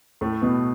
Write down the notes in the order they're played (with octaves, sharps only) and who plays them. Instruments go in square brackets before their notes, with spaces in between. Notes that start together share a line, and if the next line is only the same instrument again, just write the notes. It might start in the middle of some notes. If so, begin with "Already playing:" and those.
[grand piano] A2 A3
B2 B3